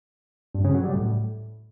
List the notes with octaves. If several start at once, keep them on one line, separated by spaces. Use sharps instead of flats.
G2
C#3
F#3
G3
A2